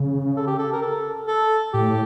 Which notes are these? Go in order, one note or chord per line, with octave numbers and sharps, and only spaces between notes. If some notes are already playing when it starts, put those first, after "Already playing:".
Already playing: C#3
A4
G4
A4
A#4
A4
A4
A2 G4